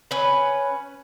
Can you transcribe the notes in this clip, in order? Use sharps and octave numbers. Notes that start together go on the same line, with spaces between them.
C#4 B4